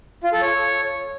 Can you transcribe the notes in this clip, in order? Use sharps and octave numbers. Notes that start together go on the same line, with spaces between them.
F4
A4
C#5